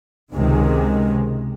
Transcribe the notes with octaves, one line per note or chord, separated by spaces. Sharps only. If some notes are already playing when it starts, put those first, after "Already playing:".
C#2 C3 D#3 G#3